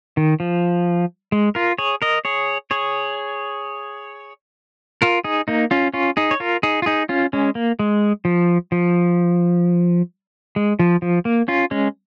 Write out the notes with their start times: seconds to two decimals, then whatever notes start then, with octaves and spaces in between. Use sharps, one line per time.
0.17 D#3
0.40 F3
1.32 G#3
1.55 F4 A#4
1.78 G#4 C#5
2.02 A#4 D#5
2.25 G#4 C#5
2.71 G#4 C#5
5.02 F4 A#4
5.24 D#4 G#4
5.48 A#3 D#4
5.71 C#4 F4
5.94 C#4 F4
6.17 D#4 G#4
6.31 C#5
6.40 F4 A#4
6.63 D#4 G#4
6.82 F4
6.86 D#4 G#4
7.09 C#4 F4
7.33 G#3 C#4
7.55 A#3
7.79 G#3
8.25 F3
8.72 F3
10.56 G#3
10.79 F3
11.02 F3
11.25 A#3
11.48 C#4 F4
11.71 G#3 C#4